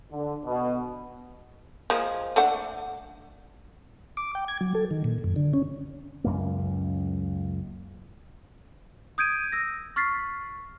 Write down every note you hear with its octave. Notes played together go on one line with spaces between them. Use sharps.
D3
B2
F3 G#3 A#3
A3 D4 F#5
D6
G5
G#6
F#3
A4
D#3
A#2
F#2
D3
C#4
C#2 F#2 A#3
D#6 G6 G#6 D7 D#7
E6 A#6
C#6 F6 A6 B6 C7